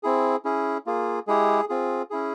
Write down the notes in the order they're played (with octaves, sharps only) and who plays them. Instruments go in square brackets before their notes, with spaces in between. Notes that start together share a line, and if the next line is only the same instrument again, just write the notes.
[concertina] C4 E4 G#4
C#4 E4 G#4
A#3 F4 G#4
G#3 E4 G4 G#4
C4 F4 G#4
C#4 E4 G#4